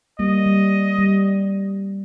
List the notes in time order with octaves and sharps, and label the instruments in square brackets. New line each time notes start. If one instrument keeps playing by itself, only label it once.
[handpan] G3 A#3 [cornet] D#5
[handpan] G3
G3